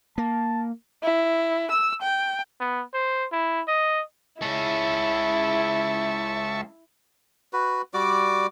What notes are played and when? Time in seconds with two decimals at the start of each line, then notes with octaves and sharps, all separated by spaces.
0.18 A#3 A5
1.03 E4
1.71 E6
2.02 G5
2.60 B3
2.94 C5
3.32 E4
3.68 D#5
4.42 G#3 C#4 E4 E5 A5 C#6
7.53 F#4 B4
7.94 G3 F#4 D5 D6